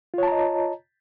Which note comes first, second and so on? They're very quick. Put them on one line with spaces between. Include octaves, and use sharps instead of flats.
F4 C#5 A5 A#5 D#5